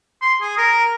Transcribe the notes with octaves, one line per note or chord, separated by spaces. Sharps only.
C6
G#4
A#4